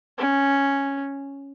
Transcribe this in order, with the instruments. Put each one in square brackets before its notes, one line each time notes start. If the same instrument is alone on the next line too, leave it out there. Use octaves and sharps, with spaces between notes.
[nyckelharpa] C#4